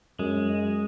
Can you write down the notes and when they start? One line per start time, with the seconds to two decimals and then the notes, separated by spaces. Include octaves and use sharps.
0.19 F#2 G#3